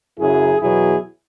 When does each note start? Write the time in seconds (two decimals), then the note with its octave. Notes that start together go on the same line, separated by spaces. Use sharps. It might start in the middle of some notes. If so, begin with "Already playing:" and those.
0.19 F#2 C#3 F#3 E4 G#4
0.61 E2 B2 F#3 B3 E4 G#4